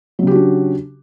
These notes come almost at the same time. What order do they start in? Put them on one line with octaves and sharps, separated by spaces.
F#3 C#3 G4 F#4 D4